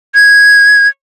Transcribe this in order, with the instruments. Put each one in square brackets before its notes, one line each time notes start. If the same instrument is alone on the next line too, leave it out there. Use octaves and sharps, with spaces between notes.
[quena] G#6